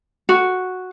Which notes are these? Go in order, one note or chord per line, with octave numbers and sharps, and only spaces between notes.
F#4